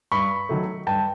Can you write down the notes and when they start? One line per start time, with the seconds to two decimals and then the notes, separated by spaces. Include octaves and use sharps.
0.12 G2 B5 C#6
0.49 D#3 F#3 A3
0.87 G2 G5 A5